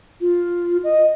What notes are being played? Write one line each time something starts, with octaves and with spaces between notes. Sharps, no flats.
F4
D#5